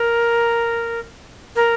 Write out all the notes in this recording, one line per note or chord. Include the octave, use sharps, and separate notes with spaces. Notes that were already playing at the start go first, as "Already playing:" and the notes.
Already playing: A#4
A#4